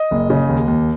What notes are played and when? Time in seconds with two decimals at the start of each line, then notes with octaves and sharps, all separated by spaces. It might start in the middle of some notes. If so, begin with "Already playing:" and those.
Already playing: D#5
0.11 F#1
0.30 C#3
0.49 D#2
0.68 D#2